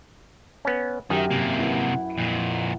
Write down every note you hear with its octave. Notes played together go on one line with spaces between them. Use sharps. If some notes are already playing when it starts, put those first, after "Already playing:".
B3 C#4
F#2 D#3 G4 E5
C3 A#3
E4 B4 F#5
F2 A#2